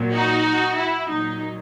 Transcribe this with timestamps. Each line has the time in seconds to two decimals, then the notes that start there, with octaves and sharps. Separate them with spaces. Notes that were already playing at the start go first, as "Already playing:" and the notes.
Already playing: A#2 F#3
0.13 D#4 F#4
0.77 E4
1.08 A#2 F#3 D#4